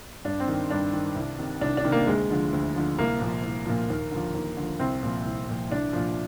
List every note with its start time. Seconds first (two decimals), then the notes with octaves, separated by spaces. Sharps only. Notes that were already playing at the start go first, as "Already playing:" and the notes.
0.25 G2 D4
0.40 C4
0.48 D#3
0.71 G2 D4
0.93 D#3
1.16 C2
1.39 C3 D#3
1.61 C2 D4
1.77 D4
1.84 C3 D#3
1.92 A#3
2.07 D2 G#3
2.30 D3 F3
2.52 D2
2.75 D3 F3
2.98 C2 A#3
3.20 A#2 F3
3.43 C2
3.66 A#2 F3
3.90 D#2
4.11 D3 F3
4.34 D#2
4.57 D3 F3
4.79 C2 C4
5.03 A#2 F3
5.25 C2
5.49 A#2 F3
5.72 C2 D4
5.93 A#2 F3